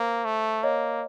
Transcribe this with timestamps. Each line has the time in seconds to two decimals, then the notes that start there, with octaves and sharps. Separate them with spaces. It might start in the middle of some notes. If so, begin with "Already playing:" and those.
Already playing: A#3 C5
0.25 A3
0.63 A#3 C#5 D#5